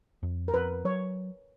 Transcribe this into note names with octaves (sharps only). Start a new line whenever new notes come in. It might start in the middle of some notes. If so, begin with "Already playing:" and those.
F2
A#4
F2 B4
F#3 C#5